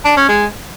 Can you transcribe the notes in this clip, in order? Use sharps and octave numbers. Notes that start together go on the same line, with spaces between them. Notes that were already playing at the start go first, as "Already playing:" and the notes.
D4
C#4
G#3